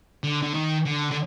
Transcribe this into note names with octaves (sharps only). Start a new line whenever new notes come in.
D3
D3
D#3
D3
D3